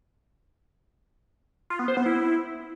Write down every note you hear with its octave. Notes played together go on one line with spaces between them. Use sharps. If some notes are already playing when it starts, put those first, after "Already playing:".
F4
B3
C5
B3
E4